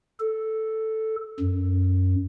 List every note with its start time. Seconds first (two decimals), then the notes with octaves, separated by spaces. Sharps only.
0.20 A4
1.40 F#2